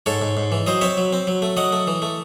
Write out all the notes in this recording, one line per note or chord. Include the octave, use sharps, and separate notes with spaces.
G#2 A4 C#5
G#2
G#2
E3
F#3 C5 D#5
C4 C#5 E5
F#3
C4
F#3
A3
F#3 D#5 F#5
A3
E3
A3